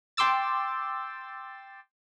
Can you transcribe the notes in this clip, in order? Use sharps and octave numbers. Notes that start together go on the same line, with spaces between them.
G5 C6 D6 E6 A6